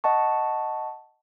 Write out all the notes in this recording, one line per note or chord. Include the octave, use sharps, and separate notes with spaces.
D#5 F#5 A5 C#6